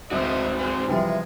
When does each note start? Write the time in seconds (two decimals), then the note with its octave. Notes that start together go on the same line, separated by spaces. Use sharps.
0.11 D1 G#2 C4 F#4 C5 D#5 E5
0.58 G#4 C5
0.88 C3 E3 F3 G3 G#3 G#4